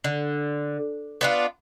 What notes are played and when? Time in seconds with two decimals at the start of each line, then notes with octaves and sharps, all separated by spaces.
0.04 D3
1.21 B3 D4 F4